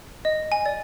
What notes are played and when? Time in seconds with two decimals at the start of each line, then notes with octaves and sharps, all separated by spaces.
0.25 D#5
0.52 G#5
0.66 D5